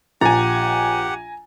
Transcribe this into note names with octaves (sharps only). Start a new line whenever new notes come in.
A#1 F3 G4 F#5 G#5 A#5 A6